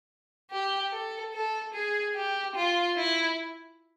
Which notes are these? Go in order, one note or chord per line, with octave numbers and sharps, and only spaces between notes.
G4
A4
A4
G#4
G4
F4
E4